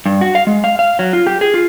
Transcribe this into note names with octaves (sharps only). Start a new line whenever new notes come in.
G2
F#4
F5
G#3
F5
F5
F#3
F4
G4
G#4
F4